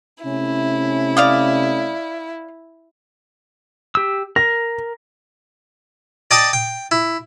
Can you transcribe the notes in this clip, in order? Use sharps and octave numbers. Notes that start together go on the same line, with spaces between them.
C3 A3 C#4 E4
D5 F5 D#6
G4 E6
A#4 A#6
D5 D#5 G5 A5 D#6
G5
E4